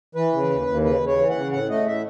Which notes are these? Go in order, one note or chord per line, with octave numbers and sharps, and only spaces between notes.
E3 B4
C#3
D#2
D#2
C#3 B4
C#3
C#5
E3
C#3 F#5
A2 F#5
A3 D#5
A2 E5